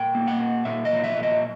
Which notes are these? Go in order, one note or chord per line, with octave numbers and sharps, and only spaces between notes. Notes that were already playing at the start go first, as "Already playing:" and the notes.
Already playing: A#2 G5
A#3
F#5
A#2
A#2 E5
D#5
F3
E5
A#2
D#5